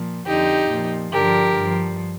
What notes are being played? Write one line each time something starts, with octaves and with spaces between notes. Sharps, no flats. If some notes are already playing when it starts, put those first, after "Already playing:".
Already playing: A#2 F3
F2 D3 F3 D#4 G4
A#2 F3
G2 D3 F3 G4 A#4
G2 F3